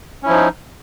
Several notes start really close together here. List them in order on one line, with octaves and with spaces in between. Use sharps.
C#4 E4 F3 D#4